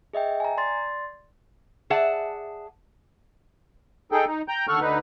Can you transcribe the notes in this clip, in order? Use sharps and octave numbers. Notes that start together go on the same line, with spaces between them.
G#4 D#5 E5 G5
G#5 A#5
D5 C6 A6
G#4 D5 E5 F#5 A5
D#4 G#4 A4 G5
D#4
G5 A#5 G6
D#2 D3 A4 F#5 C#6 F6
D2 D3 D#4 B4